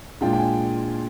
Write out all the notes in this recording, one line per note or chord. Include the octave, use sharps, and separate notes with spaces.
A#2 G#3 D4 F4 G5
G5
G#5